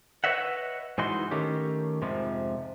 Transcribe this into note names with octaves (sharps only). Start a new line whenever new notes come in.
B4 C#5 D#5 E5 F#5
G#2 E3 D#4 F#4 C6
D#3 A3 C#4 G4
F2 G#2 C3 F3